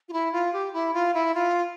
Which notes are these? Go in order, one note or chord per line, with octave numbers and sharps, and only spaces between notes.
F4
E4
F4
G4
E4
F4
E4
F4